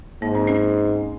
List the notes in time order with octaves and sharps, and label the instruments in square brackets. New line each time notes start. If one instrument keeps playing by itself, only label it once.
[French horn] G#2 [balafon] A#3
[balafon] C4
C#4